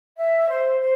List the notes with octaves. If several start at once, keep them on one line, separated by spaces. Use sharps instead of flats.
E5
C5
C5